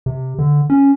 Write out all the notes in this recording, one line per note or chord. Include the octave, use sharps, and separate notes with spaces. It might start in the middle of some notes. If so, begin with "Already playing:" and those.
C3
D3
C#4